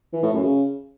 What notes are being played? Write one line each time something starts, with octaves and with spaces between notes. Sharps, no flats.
E3
A2
F#2
C#3